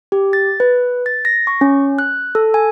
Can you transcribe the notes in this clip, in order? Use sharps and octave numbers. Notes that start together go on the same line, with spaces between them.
G4
A6
B4
A6
A#6
C#6
C#4
F#6
A4
G#5